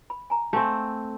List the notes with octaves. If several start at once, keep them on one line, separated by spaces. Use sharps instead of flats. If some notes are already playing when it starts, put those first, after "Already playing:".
B5
G#5 A#5
A3 C4 F5 G#5